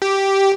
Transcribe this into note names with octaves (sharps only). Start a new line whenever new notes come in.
G4